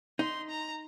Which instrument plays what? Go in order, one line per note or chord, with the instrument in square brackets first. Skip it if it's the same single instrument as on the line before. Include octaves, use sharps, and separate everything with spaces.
[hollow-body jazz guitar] D#4 [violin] C6
[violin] A#5